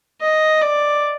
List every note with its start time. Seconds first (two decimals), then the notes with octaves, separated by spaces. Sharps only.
0.21 D#5
0.61 D5